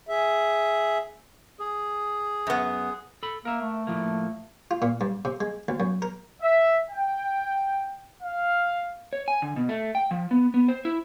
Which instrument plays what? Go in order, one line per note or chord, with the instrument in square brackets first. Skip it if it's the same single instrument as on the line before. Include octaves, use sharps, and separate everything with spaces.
[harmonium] G#4 E5
[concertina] G#4
[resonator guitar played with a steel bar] F#2 B3
[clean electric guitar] A4 B5
[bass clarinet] A#3 [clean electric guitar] A#4 E5
[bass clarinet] A3
[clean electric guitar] A2 F3 A#3
[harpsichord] F4
A#2
G2
C3
G#3
D2
F#2
A#4
[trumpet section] E5
G5
F5
[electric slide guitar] C#5
G#5
D3
B2
A3
G5
F3
B3
B3
C5
E4